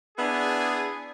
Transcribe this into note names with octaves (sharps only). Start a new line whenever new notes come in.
B3 D4 E4 G#4